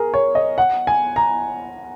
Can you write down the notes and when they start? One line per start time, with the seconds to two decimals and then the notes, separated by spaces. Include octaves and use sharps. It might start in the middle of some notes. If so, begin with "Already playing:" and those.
Already playing: G#4 A#4
0.14 C#5
0.35 D#5
0.58 F#5
0.87 G#5
1.16 A#5